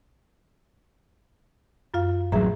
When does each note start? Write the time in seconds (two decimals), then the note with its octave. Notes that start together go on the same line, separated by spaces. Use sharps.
1.94 F#2 F4 F5
2.32 A1 F#3 G#4 E5 A#5